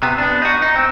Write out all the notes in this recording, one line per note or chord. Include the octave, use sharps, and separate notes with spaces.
C3 B3
B3 D4
D#4 F#4
D#4
C4